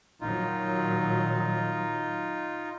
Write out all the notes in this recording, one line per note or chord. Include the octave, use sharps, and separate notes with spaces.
A#2 D#3 F#3 D#4 F4